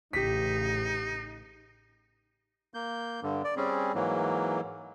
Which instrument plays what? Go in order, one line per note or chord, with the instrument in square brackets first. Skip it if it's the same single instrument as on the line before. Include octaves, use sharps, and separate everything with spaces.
[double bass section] A1 C#3 [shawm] D#4 [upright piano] G4 B6
[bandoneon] A#3 G6
G2 D3
D5
G3 C4 C#4 G#4
G#2 E3 F#3 A#3